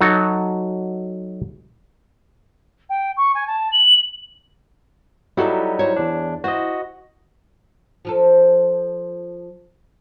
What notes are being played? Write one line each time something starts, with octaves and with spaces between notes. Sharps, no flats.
F#3 D#4 F#4 A4
G5
C#6
G#5
A5
F#7
F#3 G3 D#4 E4 F#4 A4
C5 C#5
E2 D4
E4 F#4 C5 D#5
F3 F4 A4